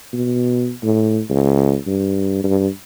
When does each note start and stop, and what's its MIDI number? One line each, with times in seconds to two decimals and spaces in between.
0.13 0.73 47
0.83 1.21 45
1.30 1.76 37
1.87 2.41 43
2.44 2.68 43